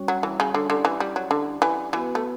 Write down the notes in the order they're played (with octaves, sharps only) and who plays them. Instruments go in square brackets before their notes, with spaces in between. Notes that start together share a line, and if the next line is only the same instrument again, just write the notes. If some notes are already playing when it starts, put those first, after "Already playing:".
Already playing: [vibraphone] G3 C#4 F#4 C#5
[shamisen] F#3
E3
C#3
D3
[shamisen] D3 [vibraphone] C#4 E4 G4 D5 F#5
[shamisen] E3
G3
F#3
D3
E3
[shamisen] E3 [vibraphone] B3 F#4 B4
[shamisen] A3